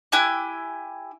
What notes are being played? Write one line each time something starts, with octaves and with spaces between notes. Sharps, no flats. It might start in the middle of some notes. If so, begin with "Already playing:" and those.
E4 G4 G#5 F#6